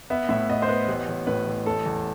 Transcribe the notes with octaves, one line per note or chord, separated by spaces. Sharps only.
B3 E5
A2 E5
B3 D#5
C5
B3 B4
A1
A1
A2 B4
A1
A3 A4
E2